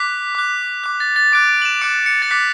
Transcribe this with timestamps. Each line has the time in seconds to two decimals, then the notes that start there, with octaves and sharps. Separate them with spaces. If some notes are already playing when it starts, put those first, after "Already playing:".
Already playing: D6 F#6 B6
0.35 D6 F#6
0.84 D6 F#6
1.00 A6
1.16 A6
1.32 D6 F#6 D7
1.49 D7
1.62 F#7
1.65 E7
1.81 D6 F#6 C#7
2.06 C#7
2.22 A6
2.31 D6 F#6 B6